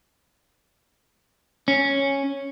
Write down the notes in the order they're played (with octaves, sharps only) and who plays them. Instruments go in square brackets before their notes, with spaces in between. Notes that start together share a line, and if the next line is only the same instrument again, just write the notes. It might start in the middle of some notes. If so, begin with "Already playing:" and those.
[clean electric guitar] C#4